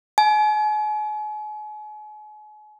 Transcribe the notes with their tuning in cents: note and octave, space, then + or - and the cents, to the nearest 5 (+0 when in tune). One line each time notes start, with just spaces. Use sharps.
G#5 +40